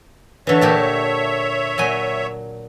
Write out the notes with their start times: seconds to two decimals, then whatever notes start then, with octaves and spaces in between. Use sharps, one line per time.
0.47 D3 E3 C#5 E5
0.61 A#2 G4 A4
1.78 A#2 F#3 G#5